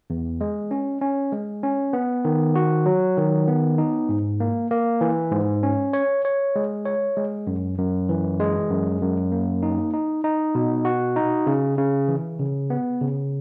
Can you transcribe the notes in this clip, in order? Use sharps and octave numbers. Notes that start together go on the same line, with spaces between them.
E2
G#3
C#4
C#4
G#3
C#4
B3
D#3
F#4
F#3
D#3
B3
D#4
G#2
A#3
A#3
E3
G#2
C#4
C#5
C#5
G#3
C#5
G#3
F#2
F#2
E3
G#3
F#2
F#2
A#3
D#4
D#4
D#4
B2
F#4
D#4
C#3
C#3
E3
C#3
B3
C#3